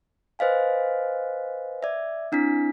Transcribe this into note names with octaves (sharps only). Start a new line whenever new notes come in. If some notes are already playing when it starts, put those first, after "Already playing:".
B4 C5 D#5 F5 G#5
D5 E5
C4 D4 E4 B6